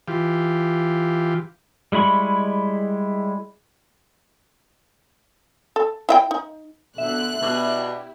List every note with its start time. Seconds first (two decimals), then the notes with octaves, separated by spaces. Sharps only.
0.08 E3 F4 G4
1.92 G3 G#3 E4 B5 C#6
5.76 A4
6.09 E4 E5 G5
6.31 D#4
6.98 B2 D3 E5 F#6
7.43 B2 D4 E4 G4